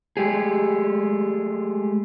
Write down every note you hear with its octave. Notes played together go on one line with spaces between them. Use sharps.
G#3 A3 G4 G#4